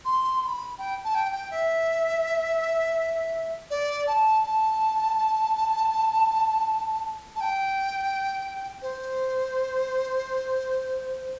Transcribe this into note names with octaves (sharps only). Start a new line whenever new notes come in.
C6
C6
B5
G5
A5
G5
G5
E5
D5
A5
A5
A5
G5
C5